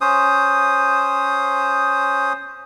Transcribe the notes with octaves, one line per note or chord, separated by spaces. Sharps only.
C#4 C5 D#6